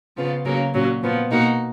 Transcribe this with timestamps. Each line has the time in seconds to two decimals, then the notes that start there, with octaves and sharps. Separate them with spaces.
0.17 C#3 F3 B3 F4
0.45 C#3 F#3 A#3 C#4
0.73 A#2 F#3 C#4
1.01 A#2 F3 B3
1.31 B2 A#3 D#4 F#4